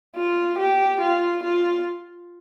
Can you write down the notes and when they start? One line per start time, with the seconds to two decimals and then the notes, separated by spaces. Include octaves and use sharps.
0.16 F4
0.59 G4
1.01 F4
1.43 F4